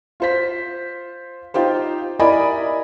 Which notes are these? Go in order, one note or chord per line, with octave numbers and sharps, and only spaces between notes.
F4 C5 B6
D#4 F4 G4 C5
E4 A#4 D5 D#5 G#5 B5